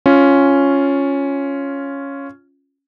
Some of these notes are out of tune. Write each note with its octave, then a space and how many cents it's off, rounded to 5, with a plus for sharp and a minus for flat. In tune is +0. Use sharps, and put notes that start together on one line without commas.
C#4 +0 F4 +0